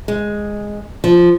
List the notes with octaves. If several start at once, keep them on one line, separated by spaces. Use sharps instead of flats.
G#3
F3